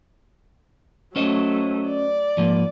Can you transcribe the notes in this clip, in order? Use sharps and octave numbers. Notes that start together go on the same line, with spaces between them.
F#3 A3 C#4 C5 D#5
D5
G#2 F3 A#3